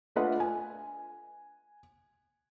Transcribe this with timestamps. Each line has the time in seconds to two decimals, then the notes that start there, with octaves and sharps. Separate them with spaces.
0.16 A3 D4 F4 B4 D#5 F#5
0.40 G#5